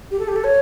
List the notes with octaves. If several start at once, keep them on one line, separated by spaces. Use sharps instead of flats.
G4
A4
G4
A4
C#5